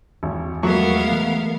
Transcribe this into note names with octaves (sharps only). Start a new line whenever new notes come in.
G#1 E2
F#3 G#3 A3 B3 A#4 F5 C#6
E3